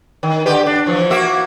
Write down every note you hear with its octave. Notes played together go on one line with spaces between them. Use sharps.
D#3
D3 G4 B4
D4
E3 F3
A#3 F#4 E5